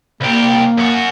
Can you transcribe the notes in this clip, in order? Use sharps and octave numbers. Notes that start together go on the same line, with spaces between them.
C2 A#3 G4
F#2 F#4